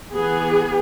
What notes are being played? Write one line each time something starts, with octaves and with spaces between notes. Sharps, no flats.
E3 B3 G#4